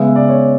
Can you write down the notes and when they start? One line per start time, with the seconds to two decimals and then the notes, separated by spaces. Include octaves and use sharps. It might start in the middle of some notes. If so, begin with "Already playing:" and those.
Already playing: C#3 G#3 B3 E5
0.16 D5
0.29 C#5